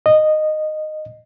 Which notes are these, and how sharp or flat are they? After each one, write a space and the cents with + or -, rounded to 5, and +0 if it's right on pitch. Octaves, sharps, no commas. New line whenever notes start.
D#5 -10